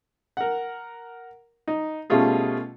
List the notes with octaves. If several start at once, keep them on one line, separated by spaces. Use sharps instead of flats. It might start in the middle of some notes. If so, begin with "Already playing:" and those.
A#4 F#5
D#4
B2 G3 A3 C#4 F4 G#4